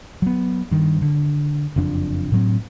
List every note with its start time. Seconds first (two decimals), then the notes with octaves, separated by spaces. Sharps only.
0.22 F#3 B3
0.71 G2 D#3
1.02 D3
1.76 F#1 F2 F3 D4
2.32 A2 F#3 C4